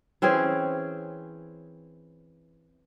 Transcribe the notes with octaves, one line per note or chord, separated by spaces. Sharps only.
E3 C4 C#4 G#4